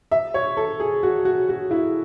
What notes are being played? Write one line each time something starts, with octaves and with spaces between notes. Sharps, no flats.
E5
C#5
A4
G#4
F#4
F#4
F#4
E4